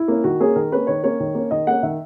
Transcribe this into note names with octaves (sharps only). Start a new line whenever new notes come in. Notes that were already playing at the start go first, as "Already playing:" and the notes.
Already playing: E4
A#3 C#4
D#3 F#4
A#3 C#4 G#4
D#3 A#4
A#3 C#4 B4
D#3 C#5
A#3 C#4 C#5
D#3
A#3 C#4
D#3 D#5
A#3 C#4 F#5
D#3 E5